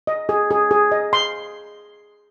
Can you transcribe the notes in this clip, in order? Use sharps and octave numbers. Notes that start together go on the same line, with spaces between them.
D#5
G#4
G#4
G#4
D#5
C6